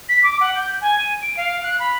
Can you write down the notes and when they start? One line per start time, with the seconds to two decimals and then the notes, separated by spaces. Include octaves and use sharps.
0.09 B6
0.23 D6
0.40 F#5
0.55 G6
0.81 G#5
0.99 D#7
1.22 D7
1.37 F5
1.63 F#6
1.79 B5